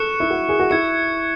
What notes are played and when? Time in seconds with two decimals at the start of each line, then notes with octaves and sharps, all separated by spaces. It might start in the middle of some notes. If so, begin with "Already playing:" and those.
Already playing: A4 C#6 F#6 C#7 E7
0.20 E4
0.30 F#4
0.49 G#4
0.60 F#4
0.70 E4 G#6 C#7 E7